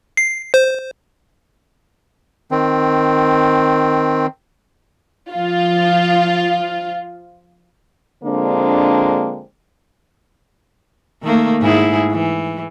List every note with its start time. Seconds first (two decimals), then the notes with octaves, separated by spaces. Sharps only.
0.17 C7
0.54 C5
2.51 D#3 C4
5.31 F3 F4
8.24 D3 F3 G#3 A#3 C4 D4
11.22 D#3 A3 A#3
11.61 G#2 E4 G#4
12.11 E3